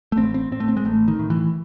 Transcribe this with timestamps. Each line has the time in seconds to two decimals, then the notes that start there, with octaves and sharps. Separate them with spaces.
0.12 A3
0.17 A1 C4
0.34 C4
0.51 A2 C4
0.60 A3
0.68 C4
0.77 G#3
0.85 A1 A3
1.08 D#3
1.19 A2
1.30 E3